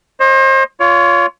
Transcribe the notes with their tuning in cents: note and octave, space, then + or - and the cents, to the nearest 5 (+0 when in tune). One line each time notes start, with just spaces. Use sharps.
C5 +35 D#5 +0
F4 +0 C#5 +30